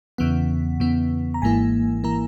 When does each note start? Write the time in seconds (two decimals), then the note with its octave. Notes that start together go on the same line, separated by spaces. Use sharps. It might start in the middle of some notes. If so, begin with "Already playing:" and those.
0.18 E2 C#3 E3 B3 F#5
0.80 E2 C#3 E3 B3
1.34 A#5
1.42 G#1 G#2 E3 A#3 E4 G#5
2.04 E3 A#3 E4 A#5